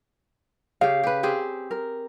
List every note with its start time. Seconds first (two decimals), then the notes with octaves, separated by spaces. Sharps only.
0.81 C#3 G4 F5
1.03 G4 B4
1.23 C4 G4 G#4
1.71 A#4